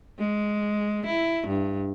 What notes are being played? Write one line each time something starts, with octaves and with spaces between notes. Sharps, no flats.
G#3
E4
G2